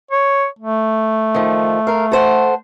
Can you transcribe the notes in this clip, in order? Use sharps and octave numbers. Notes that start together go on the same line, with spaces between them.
C#5
A3
D#3 F3
A#4 F5
A4 C5 F#5